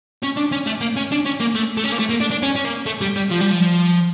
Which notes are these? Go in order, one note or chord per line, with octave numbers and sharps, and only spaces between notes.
C#4
D4
C#4
A3
A#3
C#4
D4
C#4
A#3
A3
A3
C#4
A#3
A3
A#3
D4
D4
C#4
C#4
A#3
A3
G3
G3
F3
G3
F3